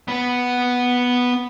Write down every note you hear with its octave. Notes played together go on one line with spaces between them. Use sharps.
B3